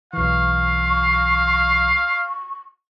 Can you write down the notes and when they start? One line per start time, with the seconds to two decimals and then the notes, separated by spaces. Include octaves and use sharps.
0.13 B1 E3 F5 C#6